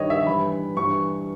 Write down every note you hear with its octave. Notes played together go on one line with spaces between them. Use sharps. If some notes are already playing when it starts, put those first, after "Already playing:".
Already playing: G2 D#3 C#5 D#5
E5
G2 E3 B5
G2 E3 C#6